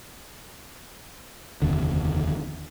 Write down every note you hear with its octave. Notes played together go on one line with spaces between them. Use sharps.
F1 D#2 D3